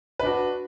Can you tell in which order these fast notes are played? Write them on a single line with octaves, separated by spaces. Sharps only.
B4 D4 F#4